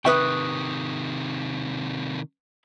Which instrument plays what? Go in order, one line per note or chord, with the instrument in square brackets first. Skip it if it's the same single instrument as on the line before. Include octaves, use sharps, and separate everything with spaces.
[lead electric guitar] C3 D#3 [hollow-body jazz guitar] B4 E5 G5 [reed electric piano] C#6 D#6